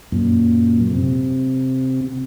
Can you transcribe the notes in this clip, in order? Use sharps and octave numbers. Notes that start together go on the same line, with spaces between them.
F#2 A#2
C3